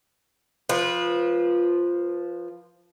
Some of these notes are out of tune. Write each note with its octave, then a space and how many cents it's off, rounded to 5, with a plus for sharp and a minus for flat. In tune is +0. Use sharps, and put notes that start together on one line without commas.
F3 +0 B4 -25